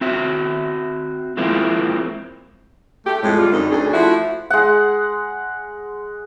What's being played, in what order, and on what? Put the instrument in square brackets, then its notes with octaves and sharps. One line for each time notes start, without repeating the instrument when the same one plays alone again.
[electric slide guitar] C4 F#4 E5
F3 G#3 A#3 C4 E4
[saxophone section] A3 G4
F2 A2 G#3
G3 F4
F#2 D3 G#3 C4 D#4
D2 C#4 D4 G#4
F3 A3 E4 F#4
[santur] G#3 F#5